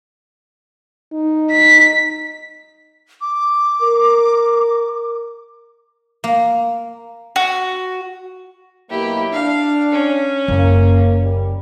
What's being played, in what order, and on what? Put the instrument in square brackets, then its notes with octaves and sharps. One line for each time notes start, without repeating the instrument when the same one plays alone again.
[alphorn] D#4
[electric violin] B6
[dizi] D6
[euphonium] A#4
[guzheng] A#3
[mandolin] F#4
[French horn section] B2 F#3 A#3 [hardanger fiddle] E4 G4
[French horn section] D4 [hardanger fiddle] F5
[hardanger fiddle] C#4
[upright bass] F#1 [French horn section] A#3
[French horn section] G3